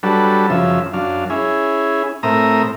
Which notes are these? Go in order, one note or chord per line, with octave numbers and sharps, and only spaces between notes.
F#3 G3 D4 A4 B4
F#2 C#3 F3 E5
F#2 D4 F5
C#4 E4 G#4
A2 C4 A#4 E5 A#5 D#6